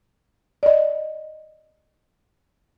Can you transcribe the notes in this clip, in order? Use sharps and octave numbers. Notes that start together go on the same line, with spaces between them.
D5 D#5